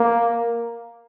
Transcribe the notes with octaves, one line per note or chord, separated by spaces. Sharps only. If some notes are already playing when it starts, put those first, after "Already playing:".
Already playing: A#3